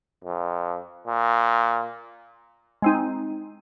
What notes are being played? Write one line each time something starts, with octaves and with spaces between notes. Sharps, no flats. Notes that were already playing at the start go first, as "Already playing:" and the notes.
F2
A#2
G#3 C4 D#4